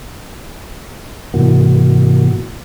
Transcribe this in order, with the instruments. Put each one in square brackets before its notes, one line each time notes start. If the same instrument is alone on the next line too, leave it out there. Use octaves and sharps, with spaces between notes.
[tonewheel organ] G#2 C3 E3 A#3 F#4